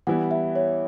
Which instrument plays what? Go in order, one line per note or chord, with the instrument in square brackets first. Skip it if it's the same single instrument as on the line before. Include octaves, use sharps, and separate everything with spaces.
[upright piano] E3 G3 B3 E4 [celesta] F#5
[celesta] E5
C#5